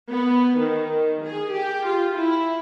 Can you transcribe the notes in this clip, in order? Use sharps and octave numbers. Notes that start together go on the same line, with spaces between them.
B3
D#3
G#4
G4
F4
E4